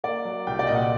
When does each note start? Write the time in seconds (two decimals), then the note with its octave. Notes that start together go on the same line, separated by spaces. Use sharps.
0.04 A#3 D5
0.25 F#3
0.47 C2 G5
0.59 D5
0.67 A#2 D#5
0.75 F#5